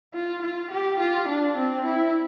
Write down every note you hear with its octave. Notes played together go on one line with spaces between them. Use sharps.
F4
F4
G4
F4
D4
C4
E4